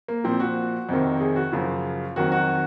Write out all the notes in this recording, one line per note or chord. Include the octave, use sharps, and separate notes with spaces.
A#3
A#2 F3 C4
F#4
F2 C3 D#3
G#4
F#4
F#2 C#3 F3 F4
F2 D#3 F#3 F#4
F#4